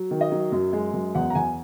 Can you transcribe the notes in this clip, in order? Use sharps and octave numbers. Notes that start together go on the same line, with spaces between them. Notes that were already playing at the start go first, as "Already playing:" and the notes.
Already playing: F#3
D#3
D#5
F#3
F#2
G#3
F#2
E2 F#5
A#5
E2 G#5